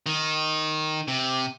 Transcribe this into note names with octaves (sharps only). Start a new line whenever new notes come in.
D#3
C3